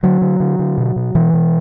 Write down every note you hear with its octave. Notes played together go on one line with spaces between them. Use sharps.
D3 F#3
D3
D3
D3
B2
B2
B2 E3
B2